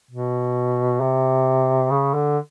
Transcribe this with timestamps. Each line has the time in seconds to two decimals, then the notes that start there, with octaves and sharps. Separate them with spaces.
0.11 B2
1.01 C3
1.91 C#3
2.14 D3